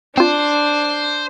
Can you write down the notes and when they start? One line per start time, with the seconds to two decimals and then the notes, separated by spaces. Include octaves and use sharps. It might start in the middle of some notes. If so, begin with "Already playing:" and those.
0.17 C4 D4 F4 C5